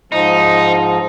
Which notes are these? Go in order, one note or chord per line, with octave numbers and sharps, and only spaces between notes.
G#2 F3 D#4